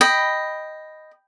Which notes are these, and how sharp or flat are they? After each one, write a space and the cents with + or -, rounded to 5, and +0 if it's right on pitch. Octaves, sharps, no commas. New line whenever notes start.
D#5 +0 G5 +0 B5 +5